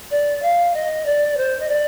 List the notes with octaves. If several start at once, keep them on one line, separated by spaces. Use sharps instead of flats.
D5
F5
D#5
D5
C5
D#5
D5